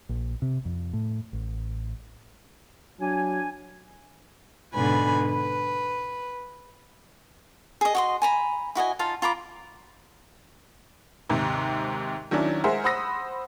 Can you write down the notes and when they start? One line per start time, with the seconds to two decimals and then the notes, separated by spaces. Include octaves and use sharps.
0.09 A#1
0.42 C3
0.65 F2
0.93 A2
1.33 A1
3.00 F#3 D4 G#5
4.74 G#2 B2 D3 B4 G#5 B5
5.26 B4
7.81 G#4 D#5
7.95 F#4 D#5 C6
8.22 G#5 A#5 B5
8.75 E4 F#4 D#5 G#5
8.99 D#4 F4 F5 A5
9.22 F4 A#5 B5 D6
11.29 D#2 G#2 C3
12.31 D#3 F#3 C#4 D4 E4
12.64 G#3 G#4 A#4 C5 E5 F#5
12.84 C5 F#5 B5 D#6 E6 A#6